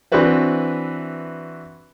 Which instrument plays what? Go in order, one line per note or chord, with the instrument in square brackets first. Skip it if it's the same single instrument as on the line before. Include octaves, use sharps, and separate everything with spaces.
[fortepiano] E3 C4 D4 F#4 B4 E5